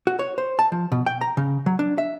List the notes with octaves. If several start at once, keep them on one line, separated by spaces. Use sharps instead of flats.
F#4
C#5
C5
A5
F3
B2
G5
A#5
C#3
F#3
D4
E5